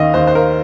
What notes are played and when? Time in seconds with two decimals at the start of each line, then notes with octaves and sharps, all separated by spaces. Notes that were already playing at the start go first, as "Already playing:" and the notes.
Already playing: D#2 D#3 D#5 F5
0.14 D#2 C5
0.27 C5
0.35 A#4